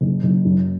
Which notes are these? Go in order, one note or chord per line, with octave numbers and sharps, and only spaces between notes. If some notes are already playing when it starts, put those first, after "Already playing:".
F#1
F#1
F#2